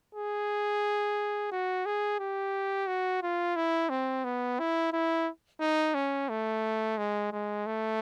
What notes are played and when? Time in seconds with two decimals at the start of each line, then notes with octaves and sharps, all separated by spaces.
0.15 G#4
1.52 F#4
1.86 G#4
2.20 G4
2.87 F#4
3.23 F4
3.56 E4
3.90 C4
4.24 B3
4.59 E4
4.93 E4
5.60 D#4
5.95 C#4
6.29 A3
6.98 G#3
7.32 G#3
7.66 A3